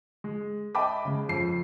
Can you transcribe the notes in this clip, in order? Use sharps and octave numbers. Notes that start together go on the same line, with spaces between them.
G#3
D#5 E5 G5 A5 B5 D6
C#3 G#3
F2 C7